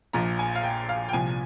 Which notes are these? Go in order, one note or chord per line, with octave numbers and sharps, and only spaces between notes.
A#1 A#2 F3 A#5
G#5
F5
G5
F5
G5
C2 A#2 F3 G#5